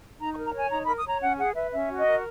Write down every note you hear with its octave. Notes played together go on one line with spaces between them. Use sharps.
D#4 A#5
C#6
A#4
A#5
C#5 G#5
D#4 A#5
A#4 B5
D#6
C#5 A#5
C#4 F#5
G#4 F#5
B4 E5
C#4 E5
F#4
D#5
A#4